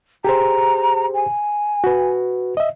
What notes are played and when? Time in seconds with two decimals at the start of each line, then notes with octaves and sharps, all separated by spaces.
0.25 G4 G#4 C5 A#5
1.14 G#5
1.84 F#4 B4
2.57 D#5 E5